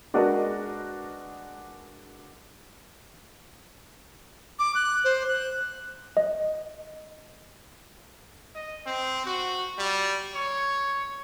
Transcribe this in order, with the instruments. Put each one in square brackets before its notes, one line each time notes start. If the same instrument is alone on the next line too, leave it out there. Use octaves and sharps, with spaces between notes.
[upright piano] G#3 D4 F#4 A#4 B4 D#5
[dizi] D6
F#6
C5
F#6
[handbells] D#5
[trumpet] D#5
C4
F#4
G3
C#5